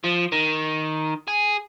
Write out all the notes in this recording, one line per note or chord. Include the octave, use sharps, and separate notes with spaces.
F3
D#3
G#4